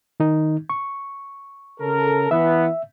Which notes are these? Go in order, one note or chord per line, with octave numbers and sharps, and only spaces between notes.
D#3 D#4
C#6
C#3 A4 A#4
E3 B3 E5